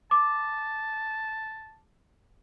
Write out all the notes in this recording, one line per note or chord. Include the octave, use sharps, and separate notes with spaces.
A5 D6